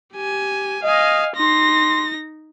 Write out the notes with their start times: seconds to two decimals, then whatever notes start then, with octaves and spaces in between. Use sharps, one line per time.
0.14 G4 G#5
0.83 D#5 F5 G#5
1.36 D#4 C6 A#6